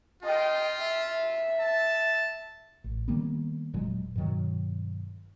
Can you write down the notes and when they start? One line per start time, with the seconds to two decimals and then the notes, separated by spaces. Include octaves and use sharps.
0.23 F4 D#5 G5
0.80 E5
1.60 A5
2.84 A1
3.08 D#3 G3 A#3 B3
3.73 E1 A#2 F#3 G#3
4.15 G2 B2 D#3 F#3